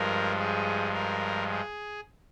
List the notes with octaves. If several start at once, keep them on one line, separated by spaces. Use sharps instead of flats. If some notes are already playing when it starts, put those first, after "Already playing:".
Already playing: G2 F3 G#3 A#4
G#4
A#4
G#4